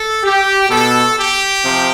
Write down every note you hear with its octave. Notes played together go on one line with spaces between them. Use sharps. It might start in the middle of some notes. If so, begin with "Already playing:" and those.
Already playing: A4
G4
B2 A4
G4
C3 F3